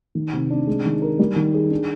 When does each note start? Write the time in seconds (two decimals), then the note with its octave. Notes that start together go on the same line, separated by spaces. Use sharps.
0.15 D#3
0.33 C3
0.50 D4
0.67 G#3
0.85 D#3
1.02 A#4
1.19 G3
1.36 D#3
1.54 G#4
1.71 D4